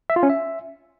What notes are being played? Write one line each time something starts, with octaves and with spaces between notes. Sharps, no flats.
E5
F4
C#4
E5